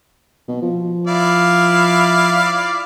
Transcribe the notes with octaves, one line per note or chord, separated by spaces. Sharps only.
B2
F3
E4 D5 F5